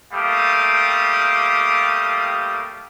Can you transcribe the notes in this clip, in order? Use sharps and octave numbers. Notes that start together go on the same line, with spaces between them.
G3 A3 A#3 G4 F5 D#6